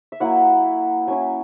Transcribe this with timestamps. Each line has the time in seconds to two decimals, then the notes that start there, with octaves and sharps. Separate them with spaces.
0.12 E5
0.20 F#3 A#3 E4 F#5
1.07 F#3 C#4 E4 G#5